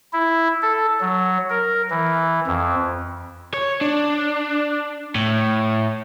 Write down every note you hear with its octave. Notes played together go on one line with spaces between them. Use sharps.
E4
A4
F#3
A#4
E3
F2
C#5
D4
A2